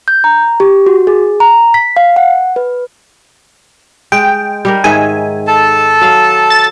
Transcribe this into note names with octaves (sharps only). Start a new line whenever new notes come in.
G6
A#5
G4
F#4
G#4
A#5
B6
F5
F#5
B4
G#3 G5
G3 G4 A#4
G#2 D#3 E5 G#5
A4 A5
F#3 F5
A6